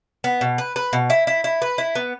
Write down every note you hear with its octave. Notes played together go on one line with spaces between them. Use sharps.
B3
B2
B4
B4
B2
E4
E4
E4
B4
E4
B3